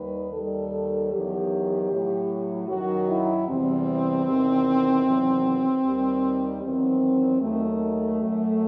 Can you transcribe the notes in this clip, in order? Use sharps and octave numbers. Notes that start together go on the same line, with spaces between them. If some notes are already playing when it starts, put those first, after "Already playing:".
Already playing: D#2 D#3 G3 B4
D#2 D#3 G3 A4
E2 D#3 F#3 G4
A2 F#3
F#2 D#3 F#3 F#4
E4
E2 C3 E3 G3 C4
E2 C3 D#3
E2 C3 D#3 F#3
D#2 D#3 G3
E2 D#3 F#3 C4
D#2 D#3 F#3 A3
F#2 F#3